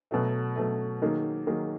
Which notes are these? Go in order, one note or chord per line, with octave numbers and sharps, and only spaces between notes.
B2 F#3 A3
B2 F#3 A3
D#3 F#3 A#3 D#4 G#4
D#3 F#3 A#3 D#4 G#4